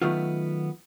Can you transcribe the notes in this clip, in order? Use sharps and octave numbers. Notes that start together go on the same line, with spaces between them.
D#3 F#3 A3 B3 F4